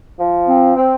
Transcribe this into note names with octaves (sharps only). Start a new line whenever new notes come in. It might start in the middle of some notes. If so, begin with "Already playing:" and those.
F3
C4
C4